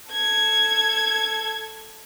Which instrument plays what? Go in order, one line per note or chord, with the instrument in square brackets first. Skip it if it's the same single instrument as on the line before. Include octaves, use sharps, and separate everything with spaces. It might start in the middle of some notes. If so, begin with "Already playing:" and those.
[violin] A4 G#6